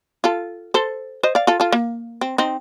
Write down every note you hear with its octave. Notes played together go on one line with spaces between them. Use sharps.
F4 A4
A4 C5
C5 D#5
D5 F5
F4 A4
F4 A4
A#3
C4
C4 D#4